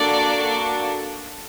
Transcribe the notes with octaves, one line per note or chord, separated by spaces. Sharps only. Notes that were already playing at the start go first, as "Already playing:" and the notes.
Already playing: A#3 D4 F#4 A4 D5